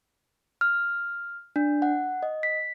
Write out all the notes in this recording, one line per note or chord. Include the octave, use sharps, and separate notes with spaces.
F6
D4
F#5
D#5
B6